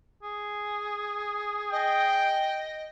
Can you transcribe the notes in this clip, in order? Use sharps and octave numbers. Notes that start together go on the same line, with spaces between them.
G#4
D#5 G5